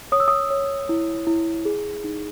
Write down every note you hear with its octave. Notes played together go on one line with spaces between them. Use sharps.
C#5 D#6
E6
D#6
C#5
E4
E4
G#4
D#4